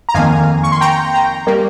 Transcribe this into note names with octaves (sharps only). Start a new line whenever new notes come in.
A#5
F2 D#3 A#3 F5 G#5
C#6
C6
G5 A#5
G5 A#5
G3 A#3